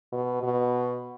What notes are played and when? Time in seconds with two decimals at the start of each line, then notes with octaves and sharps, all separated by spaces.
0.12 B2
0.43 B2